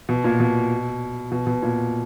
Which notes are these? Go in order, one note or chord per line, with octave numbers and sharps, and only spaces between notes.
B2
A#2
B2
B2
B2
A#2